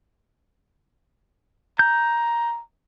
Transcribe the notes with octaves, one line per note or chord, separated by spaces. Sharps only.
A#5 G6